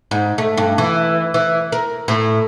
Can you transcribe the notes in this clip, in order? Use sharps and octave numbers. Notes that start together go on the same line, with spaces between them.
G#2
A3
G2
E3
E3
A#4
A2